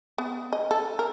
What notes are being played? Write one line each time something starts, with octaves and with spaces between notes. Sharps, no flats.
B3
D#5
A4
A#4